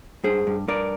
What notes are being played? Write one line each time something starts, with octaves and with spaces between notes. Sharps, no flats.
G2 G#4 C5
G2
G2 A#4 D5